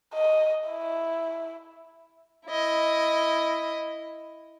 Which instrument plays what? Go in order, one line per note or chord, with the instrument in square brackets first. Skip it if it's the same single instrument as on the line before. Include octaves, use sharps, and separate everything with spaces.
[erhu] D#5
E4
[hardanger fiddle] E4 D#5